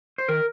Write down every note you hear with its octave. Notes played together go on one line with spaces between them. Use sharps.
C5
D#3 A#4